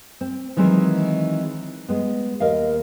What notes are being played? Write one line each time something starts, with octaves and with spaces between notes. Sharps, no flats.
C4
D#3 E3 F#3 G#3 C4 D#4
G#3 B3
D#2 A#4 D#5 F5